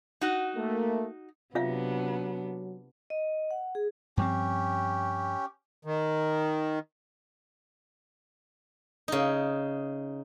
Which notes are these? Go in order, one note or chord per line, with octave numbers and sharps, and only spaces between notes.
D#4 F#4
A3 A#3
C3 F#3 B3 D4 F4 E5 F5
D#5
F#5
G#4
G2 F3 C4 C#4 G4
D#3
C#3 D#4